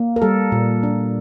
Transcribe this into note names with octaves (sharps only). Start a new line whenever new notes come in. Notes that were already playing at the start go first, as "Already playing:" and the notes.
Already playing: A#3
A#4
G3 A4
A#2
D4